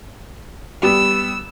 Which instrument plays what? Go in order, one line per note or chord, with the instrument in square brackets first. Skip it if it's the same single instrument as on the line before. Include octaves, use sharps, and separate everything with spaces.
[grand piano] G3 B3 [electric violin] E6